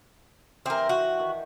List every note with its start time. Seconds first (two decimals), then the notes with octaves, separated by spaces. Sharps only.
0.66 E3 C4 G4 A#4
0.89 F#4
1.20 D#3